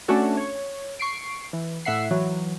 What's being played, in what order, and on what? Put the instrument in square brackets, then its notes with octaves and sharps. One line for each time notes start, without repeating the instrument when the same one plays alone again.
[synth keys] A3 C#4 D4 F#4 A4
C#5
C#6 C7 D7
E3
A2 E5 F#5 C7
E3 F#3